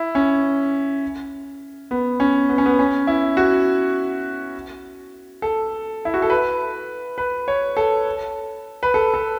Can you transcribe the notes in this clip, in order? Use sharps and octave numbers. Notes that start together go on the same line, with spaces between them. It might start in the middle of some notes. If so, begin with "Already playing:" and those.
Already playing: E4
C#4
B3
C#4
B3
C#4
B3
C#4
E4
F#4
A4
E4
F#4
A4
B4
B4
C#5
A4
B4
A4
A4